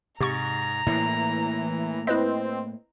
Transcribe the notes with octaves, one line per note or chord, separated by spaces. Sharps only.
G#2 C3 A#5 C#6
A2 E3 A#3
C4 E4 B4 D#5